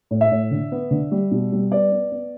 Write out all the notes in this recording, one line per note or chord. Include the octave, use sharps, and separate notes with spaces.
A2
E5
A2
D3
B3
D3
G3
B2
G3
B3 D5
B3
B3